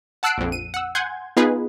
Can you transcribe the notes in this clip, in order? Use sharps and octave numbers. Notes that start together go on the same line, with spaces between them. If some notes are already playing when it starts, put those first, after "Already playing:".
F#5 A5 E6 F#6 C7 D7
A#1 F2
D#7
F#5 E6
F#5 G#5 C6 G6 G#6
B3 D#4 F4 G#4 B4